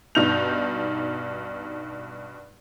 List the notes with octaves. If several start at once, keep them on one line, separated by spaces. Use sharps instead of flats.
G2 B2 D#4 F6 G6 F7